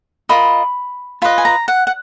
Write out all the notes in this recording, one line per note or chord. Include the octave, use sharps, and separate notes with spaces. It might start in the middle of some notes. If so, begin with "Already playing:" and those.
F4 A#4 D#5 B5
F4 B4 D#5 B5
G#5
A#5
F#5
F#5